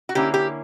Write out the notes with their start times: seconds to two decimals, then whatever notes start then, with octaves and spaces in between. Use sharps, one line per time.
0.09 F#4
0.15 D3 A#3 C#4 E4 G4
0.34 G4